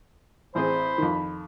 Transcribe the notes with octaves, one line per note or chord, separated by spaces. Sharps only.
A1 C4 G#4 C5 B5
F2 D#3